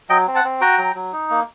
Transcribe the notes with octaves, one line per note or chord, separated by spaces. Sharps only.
F#3 D#5 G5
C4
F#5 A5
C4
F#4 G5 A#5
F#3
F#3
D#4
A#3